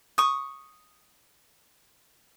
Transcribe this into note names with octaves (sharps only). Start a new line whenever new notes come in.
C#6 D#6